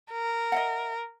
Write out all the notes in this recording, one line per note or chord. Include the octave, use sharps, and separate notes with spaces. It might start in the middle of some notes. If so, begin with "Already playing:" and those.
A#4
D#5 E5 F#5